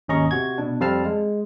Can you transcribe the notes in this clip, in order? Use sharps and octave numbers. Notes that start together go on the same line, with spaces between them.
G#1 D#2 C#4 D#5 A#5 C#6
C3 F#4 G#6
B2 D4
F2 G3 C4 F5 A5 F6
G#3